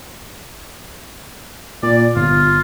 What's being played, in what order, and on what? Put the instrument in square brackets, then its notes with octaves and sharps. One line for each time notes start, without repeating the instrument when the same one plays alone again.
[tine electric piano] A#2 [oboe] D5
[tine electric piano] G1 [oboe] F4